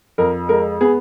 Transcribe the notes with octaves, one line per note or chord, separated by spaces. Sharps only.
F2 A#4
G#3 A#4
B3 G#4